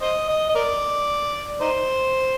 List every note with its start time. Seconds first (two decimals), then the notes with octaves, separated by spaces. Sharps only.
0.02 C5 D#5
0.28 D#5
0.49 D#5
0.55 A#4 D5
1.61 D#4 C5